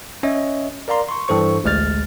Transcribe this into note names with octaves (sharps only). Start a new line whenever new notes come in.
C#4 C#5 D#5 E5
A#4 D5 F5 A#5 C6
C6 C#6
G2 E3 A4 C5 C#6
A1 D2 G#3 F6 A6